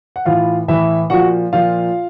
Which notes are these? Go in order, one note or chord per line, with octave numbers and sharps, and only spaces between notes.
F#5
A2 E3 F4 F5
A2 E3 E4 E5
A#2 F3 F#4 F#5
A#2 F3 F4 F5